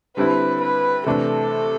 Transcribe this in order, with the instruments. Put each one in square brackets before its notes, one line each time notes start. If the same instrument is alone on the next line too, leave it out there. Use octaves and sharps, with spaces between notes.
[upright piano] D3 G3 C4 E4 [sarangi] B4
[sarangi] B4
[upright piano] C3 E3 A3 D4 [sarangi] A4